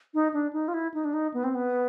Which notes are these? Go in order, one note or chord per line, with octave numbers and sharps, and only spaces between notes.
D#4
D4
D#4
F4
E4
D#4
D4
D#4
B3
C4
B3